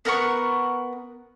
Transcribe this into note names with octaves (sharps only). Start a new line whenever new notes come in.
B3 A#4 F#5 C#6